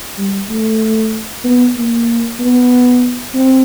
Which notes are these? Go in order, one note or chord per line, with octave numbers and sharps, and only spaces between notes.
G3
A3
B3
A#3
B3
C4